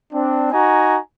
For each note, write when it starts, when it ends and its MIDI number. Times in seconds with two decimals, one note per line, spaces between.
0.12 0.49 60
0.12 0.49 62
0.52 0.99 63
0.52 0.99 66
0.52 0.99 80
0.52 0.99 82